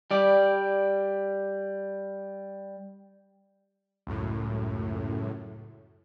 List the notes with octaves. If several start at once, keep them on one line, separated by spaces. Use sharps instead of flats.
G3 D5
C#2 F#2 A2